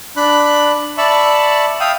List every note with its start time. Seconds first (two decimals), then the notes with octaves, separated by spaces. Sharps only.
0.16 D4 B5 F#6
0.98 D5 E5 A5 B5 C#6
1.80 E5 F5 G5 D#6